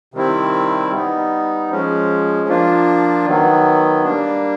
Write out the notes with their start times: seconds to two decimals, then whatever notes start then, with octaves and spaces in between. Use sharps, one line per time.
0.14 C3 D#3 G3 C4 E4
0.92 G3 B3 D#4
1.70 F3 G#3 C#4
2.48 F3 A#3 D4 F4
3.26 D#3 F#3 B3
4.04 G3 A#3 D4